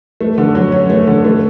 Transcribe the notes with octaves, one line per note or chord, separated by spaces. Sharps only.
A3
D3
F#3
C#4
A3
D3
A3